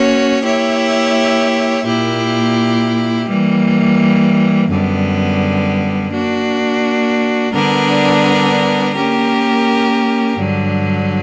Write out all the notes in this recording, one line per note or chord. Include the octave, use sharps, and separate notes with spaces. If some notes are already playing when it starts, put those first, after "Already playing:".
Already playing: A#3 C#4 F#4 C#5
A#3 E4 G4 C#5 E5
A#2 A#3 E4 G4
E3 G3 A#3
F#2 D3 G3 B3
A#3 D4 F#4
D3 G3 B3 D4 A#4
A#3 C#4 G4 A#4
G2 D3 F#3